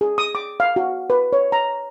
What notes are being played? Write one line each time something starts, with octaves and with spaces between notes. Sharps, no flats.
G#4
D#6
D6
F5
F#4
B4
C#5
A#5